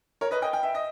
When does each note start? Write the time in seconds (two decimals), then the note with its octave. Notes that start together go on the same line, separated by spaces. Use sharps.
0.21 A#4 C#5
0.31 B4 D#5
0.42 D#5 G5
0.53 G5
0.63 E5
0.75 D#5